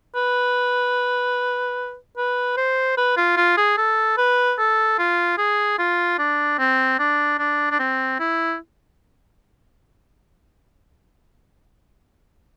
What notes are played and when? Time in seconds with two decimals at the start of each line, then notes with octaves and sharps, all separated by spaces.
0.15 B4
2.17 B4
2.57 C5
2.97 B4
3.16 F4
3.37 F4
3.57 G#4
3.78 A4
4.17 B4
4.58 A4
4.99 F4
5.38 G#4
5.78 F4
6.18 D4
6.59 C4
6.99 D4
7.39 D4
7.71 D4
7.79 C4
8.19 E4